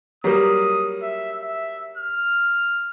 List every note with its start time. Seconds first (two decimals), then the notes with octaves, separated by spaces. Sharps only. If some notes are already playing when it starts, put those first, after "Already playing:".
0.24 F#3 G3 A#3 D#6
1.02 E5
1.43 E5
1.98 F6